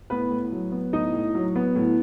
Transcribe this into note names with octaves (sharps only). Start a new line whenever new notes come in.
A2 B3 B4
A2
F#3
B3
A2 D#4 D#5
A2
F#3
B3
A2